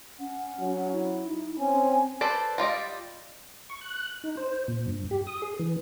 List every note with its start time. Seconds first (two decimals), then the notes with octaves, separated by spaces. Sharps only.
0.19 C#4 F#5
0.60 F#3
0.92 E4
1.26 D#4
1.59 C4 C#4 G#5
2.21 A4 B4 C5 D5
2.58 G3 F4 D5 D#5
3.70 C#6
3.81 F#6
4.24 D#4
4.37 C5
4.68 A#2
4.88 G2
5.11 G4
5.27 D#6
5.42 G#4
5.59 E3